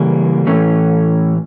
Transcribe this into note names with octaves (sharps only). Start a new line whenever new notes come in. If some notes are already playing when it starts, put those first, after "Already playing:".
Already playing: C#3 E3 G3 A#3
A2 E3 A3 C#4